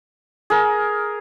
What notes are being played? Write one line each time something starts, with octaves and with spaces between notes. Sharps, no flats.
G#4 A#4